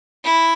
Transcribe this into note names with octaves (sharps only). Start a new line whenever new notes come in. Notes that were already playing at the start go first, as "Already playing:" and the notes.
E4